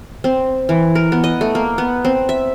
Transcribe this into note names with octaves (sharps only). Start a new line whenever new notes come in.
C4
E3
A#4
B3
D#5
A3
A#3
B3
C4
E5